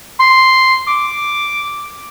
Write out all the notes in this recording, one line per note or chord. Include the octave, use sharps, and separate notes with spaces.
C6
D6